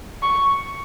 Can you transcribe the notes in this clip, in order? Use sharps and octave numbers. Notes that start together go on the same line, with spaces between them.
C#6